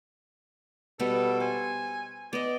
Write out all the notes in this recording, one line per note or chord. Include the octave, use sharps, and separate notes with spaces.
B2 G3 B3 A4
C5 G#5
B3 D5 D#5